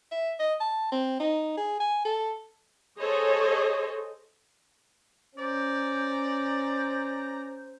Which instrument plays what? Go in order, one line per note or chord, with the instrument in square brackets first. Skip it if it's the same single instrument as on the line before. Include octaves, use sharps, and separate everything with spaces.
[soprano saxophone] E5
D#5
A5
C4
D#4
G#4
G#5
A4
[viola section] G#4 A4 C5 C#5 D#5
[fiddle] C#4 A#5 [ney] C5 [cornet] D5